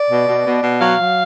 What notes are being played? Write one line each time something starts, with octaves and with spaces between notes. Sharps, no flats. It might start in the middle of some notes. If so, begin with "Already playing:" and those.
Already playing: D5
B2
B2
B2
B2
F#3 F5
F#3